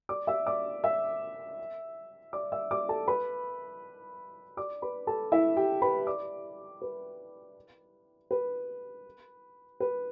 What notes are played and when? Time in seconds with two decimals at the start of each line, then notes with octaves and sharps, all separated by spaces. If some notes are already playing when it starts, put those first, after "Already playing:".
0.09 D5 D6
0.27 E5 E6
0.46 D5 D6
0.84 E5 E6
2.33 D5 D6
2.52 E5 E6
2.71 D5 D6
2.89 A4 A5
3.08 B4 B5
4.57 D5 D6
4.82 B4 B5
5.07 A4 A5
5.32 E4 E5
5.56 G4 G5
5.82 B4 B5
6.07 D5 D6
6.82 B4
8.31 B4
9.80 B4